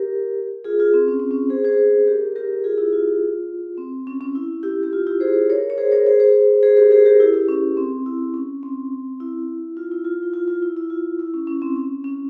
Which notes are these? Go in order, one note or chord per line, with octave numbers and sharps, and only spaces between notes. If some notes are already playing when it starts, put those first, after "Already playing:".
Already playing: G4 A#4
F4 G#4
F4 G#4
C4
C#4
C4
C#4
G#4 C5
G#4 C5
G4 A#4
G4 A#4
F4 G#4
E4 G4
F4
C4
C#4
C#4
E4
E4 G4
G4
F4
E4 G4
G#4 C5
A#4 C#5
C#5
G#4 C5
A#4 C#5
G#4 C5
G#4 C5
G#4 C5
G4 A#4
G#4 C5
G4 A#4
E4 G4
E4
C#4
C4
E4
C#4
C4
E4
F4
E4
F4
E4
F4
F4
E4
E4
F4
E4
C#4
C#4
C4
C#4
C#4